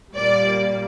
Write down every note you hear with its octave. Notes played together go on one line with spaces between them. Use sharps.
A#2 G3 A#3 D5